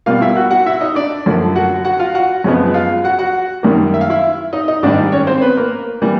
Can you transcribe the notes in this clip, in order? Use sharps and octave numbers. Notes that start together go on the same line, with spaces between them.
B2 G3 A#3 F4 F5
E4 E5
F#4 F#5
F#4 F#5
E4 E5
D#4 D#5
D4 D5
F#2 D3 F3 A#3
F#4 F#5
F#4 F#5
F4 F5
F#4 F#5
F#2 C#3 F3 G#3 B3
F4 F5
F#4 F#5
F#4 F#5
F#2 D#3 G3 A#3
E5
F5
E4 E5
D#4 D#5
D#4 D#5
G#2 D#3 G3 D4 D5
C#4 C#5
C4 C5
B3 B4
A#3 A#4
E3 G3 A#3